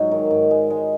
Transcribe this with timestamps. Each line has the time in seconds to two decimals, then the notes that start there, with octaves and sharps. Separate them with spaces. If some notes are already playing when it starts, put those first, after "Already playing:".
Already playing: G#2 F#3 D#4
0.11 D#3
0.31 G#2
0.51 G#3
0.70 G#3